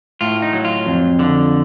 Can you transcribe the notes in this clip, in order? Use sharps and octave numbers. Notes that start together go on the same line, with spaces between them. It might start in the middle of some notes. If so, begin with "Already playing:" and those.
A2 F4
D#4
F#3
F4
F2
D3